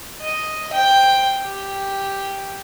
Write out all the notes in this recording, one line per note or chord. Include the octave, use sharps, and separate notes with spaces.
D#5
C5 G5
G4